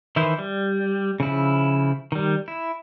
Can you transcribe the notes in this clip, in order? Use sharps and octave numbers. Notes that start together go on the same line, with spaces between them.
D#3 E3 E4 C5
G3
C#3 F3 E4
D#3 G3
E4